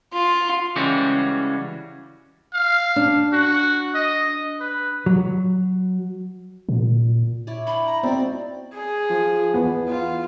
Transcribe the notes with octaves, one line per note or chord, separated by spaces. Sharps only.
F4
C#3 E3 G3 G#3 C#4 F#4
F5
D4
F#4
D#5
B4
F#3
A#2
E4 C#5 D5
D4 G5 B5
A#5
C4 D#4 F#4 D5
G#4
F3
E2 B3
F4